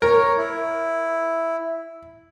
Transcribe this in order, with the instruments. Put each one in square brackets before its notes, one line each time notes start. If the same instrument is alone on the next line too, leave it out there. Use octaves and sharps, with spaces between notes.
[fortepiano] A#4 [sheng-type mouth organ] C#5
[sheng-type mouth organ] E4